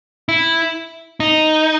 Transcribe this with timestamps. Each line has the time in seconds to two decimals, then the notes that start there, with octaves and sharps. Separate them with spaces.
0.29 E4
1.20 D#4